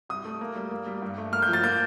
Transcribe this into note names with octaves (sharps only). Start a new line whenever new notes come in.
C2 D#6
A3
A#3
G3
A#3
G3
G2
A3
A#3 F6
G6
F3 A6
A#3 G6